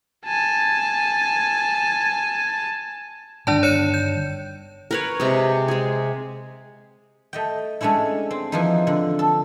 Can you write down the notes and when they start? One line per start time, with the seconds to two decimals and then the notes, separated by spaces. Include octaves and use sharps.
0.25 G#5 A5
3.47 G2 D3 D#3 D4 D5 A5
3.63 C#5 C#7 E7
3.94 G6
4.91 A#4 B4 C#5
5.20 C3 G#3
5.68 G#3 G#4
7.33 A3 D#5 G5
7.81 G#3 A3 C#4 D4 E4
8.31 C4
8.52 E3 F3 D#4
8.87 D3
9.19 A4